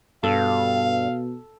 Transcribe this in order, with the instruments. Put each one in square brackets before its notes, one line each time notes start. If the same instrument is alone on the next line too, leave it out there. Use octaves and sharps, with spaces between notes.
[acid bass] G2 [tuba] B2 [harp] A4 [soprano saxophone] F5